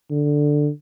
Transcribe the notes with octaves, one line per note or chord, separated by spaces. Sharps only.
D3